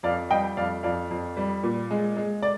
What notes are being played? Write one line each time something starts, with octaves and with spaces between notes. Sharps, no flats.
F2 D5 F5
G3 D#5 G5
F2 D5 F5
F2 D5 F5
F2
G3
A#2
G#3
G#3
D5